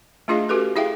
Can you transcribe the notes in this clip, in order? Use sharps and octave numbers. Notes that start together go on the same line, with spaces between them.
A3 D4 F4 G#4 D#5 F5
C#4 F#4 G4 A4 B4
E4 G#4 E5 F5 G5